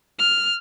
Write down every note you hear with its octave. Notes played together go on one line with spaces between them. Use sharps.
F6